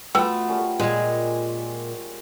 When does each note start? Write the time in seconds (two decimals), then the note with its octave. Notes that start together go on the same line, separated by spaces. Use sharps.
0.15 A3 B3 F4 F#4 A4 B4 G5
0.48 G3 C#4 A#4
0.80 A#2 G#3 G#4